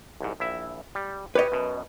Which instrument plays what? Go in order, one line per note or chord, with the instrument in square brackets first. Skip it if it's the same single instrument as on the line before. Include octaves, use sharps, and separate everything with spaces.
[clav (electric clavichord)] C2 G#2
A#1 E4 E5
G3
[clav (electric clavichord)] G4 C#5 [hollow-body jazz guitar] B4 D#5
[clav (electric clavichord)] F#2 B2